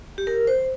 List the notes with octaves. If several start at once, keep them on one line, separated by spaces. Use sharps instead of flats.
G4
A#4
C5